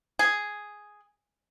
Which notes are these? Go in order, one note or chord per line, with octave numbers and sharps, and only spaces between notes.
G#4